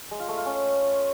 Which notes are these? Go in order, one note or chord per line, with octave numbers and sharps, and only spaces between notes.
G#3
F4
A3
F4
C#4